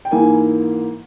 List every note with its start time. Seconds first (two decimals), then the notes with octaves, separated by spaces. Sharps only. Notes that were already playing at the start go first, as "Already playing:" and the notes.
0.05 G5
0.11 G#2 E3 A#3 G#5